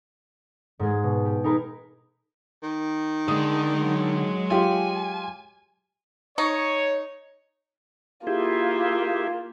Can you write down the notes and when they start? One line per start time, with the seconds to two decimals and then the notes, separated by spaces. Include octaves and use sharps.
0.79 G#2 G#3 G#4
1.03 B2
1.25 G4
1.44 D#4 G#4 A#4 B4 G#5
2.63 D#3
3.28 D3 G#3 D#6
3.76 F#3 G#3
4.50 F4 G4 G#5
6.38 D#4 C#5
8.27 A#3 E4 F4 G4 G#4